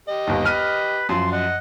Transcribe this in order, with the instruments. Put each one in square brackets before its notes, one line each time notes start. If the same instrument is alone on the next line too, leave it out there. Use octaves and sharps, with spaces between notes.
[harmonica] G4 D#5
[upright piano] G1 D#2
[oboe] B4 [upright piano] F6 D#7
[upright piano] F#2 F3 [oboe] C6
[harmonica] D#5 [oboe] F#5